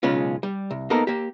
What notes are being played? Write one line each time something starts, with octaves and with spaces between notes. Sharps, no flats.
B1 C#3 G#3 C#4 F4
G3
C2
A#3 B3 D#4 A4 A#4
A#3 G4